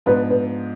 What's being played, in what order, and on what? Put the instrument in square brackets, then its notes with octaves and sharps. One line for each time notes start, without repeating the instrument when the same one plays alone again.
[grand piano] G#2 F3 B3 D4 [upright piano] B4
[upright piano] B4